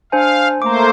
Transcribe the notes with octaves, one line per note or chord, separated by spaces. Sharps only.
D4 C5 F5 G#5
A3 A#3 C5 A#5 D6